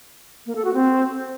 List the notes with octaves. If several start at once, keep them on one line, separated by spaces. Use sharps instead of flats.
A#3
A4
F#4
C4